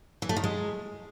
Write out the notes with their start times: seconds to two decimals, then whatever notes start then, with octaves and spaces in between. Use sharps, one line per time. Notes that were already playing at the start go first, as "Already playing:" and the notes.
0.22 E3
0.29 A3
0.36 D#3
0.44 G#3